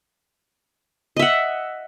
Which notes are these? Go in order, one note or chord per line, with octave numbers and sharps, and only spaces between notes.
D#5 E5 F#5